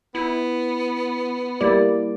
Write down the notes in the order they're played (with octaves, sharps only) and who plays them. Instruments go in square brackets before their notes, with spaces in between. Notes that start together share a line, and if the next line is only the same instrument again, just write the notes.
[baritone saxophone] B3 [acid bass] E4
[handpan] G3 A#3 D5 [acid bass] E4